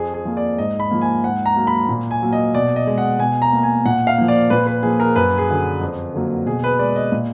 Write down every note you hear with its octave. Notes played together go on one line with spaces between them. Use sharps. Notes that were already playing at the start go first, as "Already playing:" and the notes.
Already playing: F2 G#4
G#4
F3 A#3
D5
G#2 D#5
B5
F3 A#3
G#5
G#2 F#5
A#5
F#3 A#3
B5
A#2
G#5
F#3 A#3
D#5
B2 D5
D#5
G#3
F#5
B2 G#5
A#5
A#3
G#5
A#2 F#5
F5
F3 A#3
D5
A#2 B4
B4
F3 A#3 G#4
A#4
F#2 B4
G#4
D3 F#3
F2
D3 F#3 A#3
B2 G#4
B4
G#3 D5
D#5
A#2